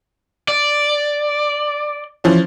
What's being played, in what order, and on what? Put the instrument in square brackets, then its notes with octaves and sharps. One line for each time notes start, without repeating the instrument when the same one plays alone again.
[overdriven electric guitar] D5
[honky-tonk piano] E3 F3 C#4